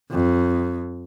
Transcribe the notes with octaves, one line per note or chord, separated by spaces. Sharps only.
F2